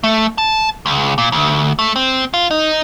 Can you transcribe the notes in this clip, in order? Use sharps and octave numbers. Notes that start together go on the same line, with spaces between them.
A3
A5
C#2
A#2
D2
A3
C4
F4
D#4